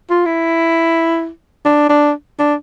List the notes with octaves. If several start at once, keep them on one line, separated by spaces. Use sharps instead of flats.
F4
E4
D4
D4
D4